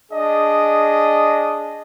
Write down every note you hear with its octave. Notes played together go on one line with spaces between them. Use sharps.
D4 G#4 D#5